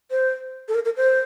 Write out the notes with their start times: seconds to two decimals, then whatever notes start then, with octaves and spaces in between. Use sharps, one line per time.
0.11 C5
0.68 A4
0.74 A#4
0.85 A#4
0.97 C5